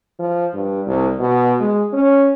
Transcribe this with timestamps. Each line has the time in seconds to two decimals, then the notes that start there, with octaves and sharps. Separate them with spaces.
0.19 F3
0.54 G2
0.86 C2
1.19 B2
1.60 G#3
1.93 C#4